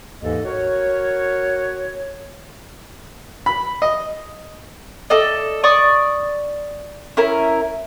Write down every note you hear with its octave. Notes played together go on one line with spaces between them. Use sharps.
D#2 G#2 E3 A4 D#5
F#4 A#4 C#5
B5
D#5
A4 D5 D#5
D5 C#6 D#6
C#4 E4 A#4